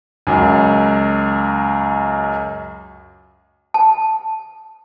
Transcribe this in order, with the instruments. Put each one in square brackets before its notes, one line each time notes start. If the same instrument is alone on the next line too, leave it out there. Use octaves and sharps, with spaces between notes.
[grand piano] C#2 F#2
[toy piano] A5